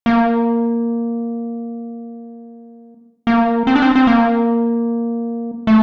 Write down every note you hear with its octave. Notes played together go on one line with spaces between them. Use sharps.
A#3
A#3
C4
D4
C4
C4
A#3
A3